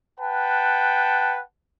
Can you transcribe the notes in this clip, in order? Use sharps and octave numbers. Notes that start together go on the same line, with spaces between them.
B4 F#5 G5 A5